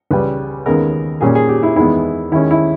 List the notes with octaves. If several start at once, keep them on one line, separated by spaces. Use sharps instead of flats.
C#2 C#3 G3 B4
D#2 C#3 G#3 B3 A#4
A#2 G3 C#4 G#4
G#4
G4
E4
E2 D#3 G#3 B3 E4
D#2 D#3 G#3 C#4 E4
E4